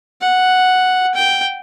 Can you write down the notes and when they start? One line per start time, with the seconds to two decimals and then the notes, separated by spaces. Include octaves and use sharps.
0.21 F#5
1.15 G5